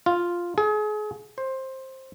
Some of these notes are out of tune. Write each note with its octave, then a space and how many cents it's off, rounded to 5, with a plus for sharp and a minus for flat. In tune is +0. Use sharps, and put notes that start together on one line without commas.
F4 +0
G#4 +35
C5 +15